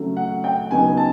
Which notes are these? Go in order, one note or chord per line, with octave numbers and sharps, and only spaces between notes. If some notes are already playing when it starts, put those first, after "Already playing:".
Already playing: C#3 F#3 A3 C#4
F#5
G5
C#3 F#3 B3 D#4 G#5
A5